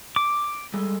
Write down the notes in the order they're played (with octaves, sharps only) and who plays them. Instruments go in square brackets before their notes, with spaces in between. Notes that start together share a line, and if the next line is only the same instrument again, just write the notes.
[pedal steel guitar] D6
[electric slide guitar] G3 G#3 A4